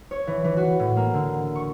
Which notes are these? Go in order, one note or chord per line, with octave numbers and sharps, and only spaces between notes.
C#5
E3
E3
F#4
A2
A#3
D3
C#6